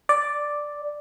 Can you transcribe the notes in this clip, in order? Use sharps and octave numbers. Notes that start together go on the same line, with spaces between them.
D5